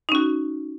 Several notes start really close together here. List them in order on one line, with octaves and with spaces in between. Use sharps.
D#4 C#4 F#4